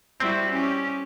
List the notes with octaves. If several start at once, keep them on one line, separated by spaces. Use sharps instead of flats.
G3 C4 E4 F#4
C#4 G4